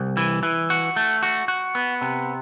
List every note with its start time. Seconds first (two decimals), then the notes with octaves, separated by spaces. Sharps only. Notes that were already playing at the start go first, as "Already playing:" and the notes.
Already playing: C2
0.17 E3
0.43 E3
0.70 F#4
0.96 A3
1.22 F#4
1.48 F#4
1.75 B3
2.01 C3